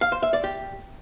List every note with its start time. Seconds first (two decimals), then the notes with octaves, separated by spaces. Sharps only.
0.01 F5
0.12 C5
0.22 E5
0.33 D5
0.44 G4